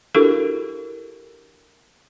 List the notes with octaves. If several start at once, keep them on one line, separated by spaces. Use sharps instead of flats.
D4 E4 F#4 G4 A4 A#4